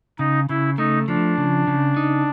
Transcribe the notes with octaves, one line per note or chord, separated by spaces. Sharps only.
C#3 D#4
C#3 E4
A3 D#4
F3 D4
C#3
C#3
D#4